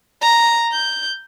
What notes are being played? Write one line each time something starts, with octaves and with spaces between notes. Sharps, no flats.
A#5
G6